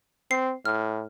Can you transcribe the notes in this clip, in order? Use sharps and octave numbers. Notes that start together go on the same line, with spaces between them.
C4 C7
A2 F6